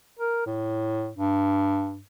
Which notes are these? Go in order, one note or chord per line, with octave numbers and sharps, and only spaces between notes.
A#4
A2
G2